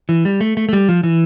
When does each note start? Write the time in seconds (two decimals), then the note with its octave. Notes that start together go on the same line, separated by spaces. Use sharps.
0.09 E3
0.25 G3
0.41 A3
0.57 A3
0.69 A3
0.73 G3
0.89 F3
1.03 E3